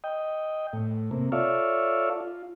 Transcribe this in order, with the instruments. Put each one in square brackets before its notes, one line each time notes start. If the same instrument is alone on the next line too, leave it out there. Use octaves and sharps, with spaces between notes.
[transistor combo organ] D#5 G5
A2
C3 A#3
F4 A4 C#5 D5 E5 F5
F4